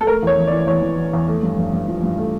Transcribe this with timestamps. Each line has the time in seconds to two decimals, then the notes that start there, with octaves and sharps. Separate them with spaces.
0.01 A4
0.07 A3 A#4
0.23 E2 C#5
0.38 E3
0.47 D5
0.52 E3
0.67 E2 C#5
0.82 E3
0.97 E3
1.13 E2
1.28 A3
1.43 G2
1.58 G2
1.73 G2
1.88 F3
2.03 G2
2.18 A3